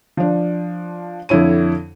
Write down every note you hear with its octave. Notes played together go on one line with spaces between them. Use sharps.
F3 D4
F2 D3 E4 C#5 D#7